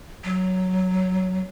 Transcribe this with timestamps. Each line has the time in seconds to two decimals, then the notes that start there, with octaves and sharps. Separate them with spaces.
0.24 F#3